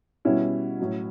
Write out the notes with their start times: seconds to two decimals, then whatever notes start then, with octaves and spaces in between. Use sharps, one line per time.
0.25 B2 G3 C#4 E4
0.79 A2 F#3